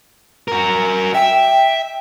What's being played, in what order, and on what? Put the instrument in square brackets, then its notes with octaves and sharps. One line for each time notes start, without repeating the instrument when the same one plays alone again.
[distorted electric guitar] F#4 A#4
[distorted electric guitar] E5 [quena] G5